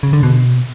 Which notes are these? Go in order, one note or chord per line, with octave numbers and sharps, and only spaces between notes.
C#3
D3
B2